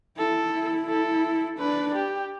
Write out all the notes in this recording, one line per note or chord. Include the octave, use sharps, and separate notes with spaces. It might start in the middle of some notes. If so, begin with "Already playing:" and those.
E4 A4
E4
A4
D4 B4
G4